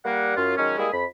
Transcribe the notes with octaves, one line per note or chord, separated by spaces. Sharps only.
G3 A#3 F#5
F#2 F4
D#3 F#3 G#3 C#4
G3 G#3 A#3 E4 G#4
F2 B5